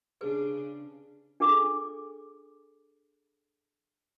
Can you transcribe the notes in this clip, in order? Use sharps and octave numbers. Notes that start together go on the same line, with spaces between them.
C#3 D4 G4 G#4 B4
D4 G#4 A4 D6